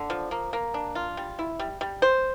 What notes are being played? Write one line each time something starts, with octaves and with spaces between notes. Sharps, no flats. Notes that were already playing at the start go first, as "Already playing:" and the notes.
Already playing: D3
F3
A#3
A#3
D4
F4
G3
E4
G3
G3
C5